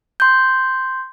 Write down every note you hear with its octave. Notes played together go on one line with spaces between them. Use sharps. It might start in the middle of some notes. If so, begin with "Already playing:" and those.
C6 G6